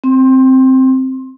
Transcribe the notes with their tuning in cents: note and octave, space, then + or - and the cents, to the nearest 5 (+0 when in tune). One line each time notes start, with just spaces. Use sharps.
C4 +0 C6 +25